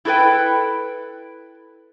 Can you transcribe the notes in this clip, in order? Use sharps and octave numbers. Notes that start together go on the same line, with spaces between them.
E4 F#4 A4 B4 G5